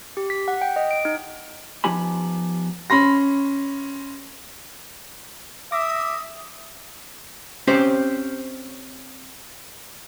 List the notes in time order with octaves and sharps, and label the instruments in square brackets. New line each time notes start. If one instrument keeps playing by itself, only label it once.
[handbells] G4
B6
F#5
G5
D#5
D7
D#4
[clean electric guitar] F3 B3 D#4 G4 G#5 B5
[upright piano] C#4 B5 C6 A#6
[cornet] E5 [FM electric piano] D6 A#6 [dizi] D#6
[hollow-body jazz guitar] C4 C#4 G4 C5